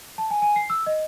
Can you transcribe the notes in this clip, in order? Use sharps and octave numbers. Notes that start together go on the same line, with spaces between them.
A5
G#5
G#5
C7
E6
D#5